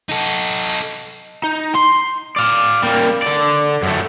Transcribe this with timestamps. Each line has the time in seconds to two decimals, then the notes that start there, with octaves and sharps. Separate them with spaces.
0.09 D#4 A4
1.44 D#4
1.75 C6
2.36 D5 F5
2.83 G3 A#3
3.22 D3 D5
3.83 F#2 A3